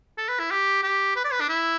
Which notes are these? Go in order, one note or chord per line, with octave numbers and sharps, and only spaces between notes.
A4
B4
E4
G4
G4
B4
D5
B4
D4
E4